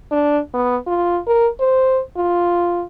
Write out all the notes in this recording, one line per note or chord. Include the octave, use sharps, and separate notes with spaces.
D4
B3
F4
A#4
C5
F4